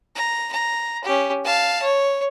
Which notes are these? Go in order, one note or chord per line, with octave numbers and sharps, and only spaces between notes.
A#5
A#5
C#4 G4
F5 A5
C#5